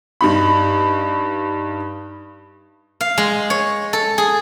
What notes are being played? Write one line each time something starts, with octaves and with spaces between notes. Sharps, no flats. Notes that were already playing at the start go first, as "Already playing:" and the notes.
G2 D#4 B5
F5
G#3
C#5
A4
G#4